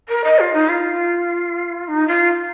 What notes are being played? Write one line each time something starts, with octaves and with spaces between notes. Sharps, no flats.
A#4
D#5
F4
D#4
F4
D#4
F4